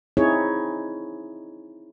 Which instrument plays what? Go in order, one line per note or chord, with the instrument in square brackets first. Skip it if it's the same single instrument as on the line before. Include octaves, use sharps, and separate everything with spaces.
[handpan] C4 D#4 E4 G#4 C#5